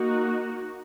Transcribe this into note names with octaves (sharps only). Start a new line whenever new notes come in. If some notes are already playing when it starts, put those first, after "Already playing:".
Already playing: A#3 D#4 F#4